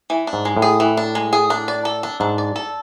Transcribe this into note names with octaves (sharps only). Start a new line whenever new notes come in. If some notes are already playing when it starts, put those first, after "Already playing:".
E3
D4
G#2
G#3
A2
G#4
E3
D4
G#3
G#4
D4
D5
A4
D4
G#2 D4
D5
A4